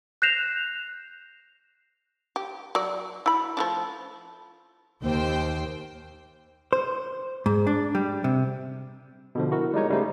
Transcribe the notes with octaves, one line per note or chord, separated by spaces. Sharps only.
F#6 G6 A#6 C7 E7 F7
G4
F#3 D5
E4 B5
F3 A3 D4
D#2 C5 G5
C5
G#2
D4
G3
C3
B2 D3 F3
E4 F#4 A#4
G3 G#3 D#4 C#5
C#3 G3 A3 D#4 C5